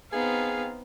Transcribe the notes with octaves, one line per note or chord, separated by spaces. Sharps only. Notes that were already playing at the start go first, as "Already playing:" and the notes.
B3 C4 D#4 G#4 F5